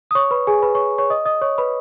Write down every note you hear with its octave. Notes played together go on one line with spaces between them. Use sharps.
D#6
C#5 C#6
B4 B5
G#4 G#5
B4 B5
C#5 C#6
C#5 C#6
D#5 D#6
D#5 D#6
C#5 C#6
B4 B5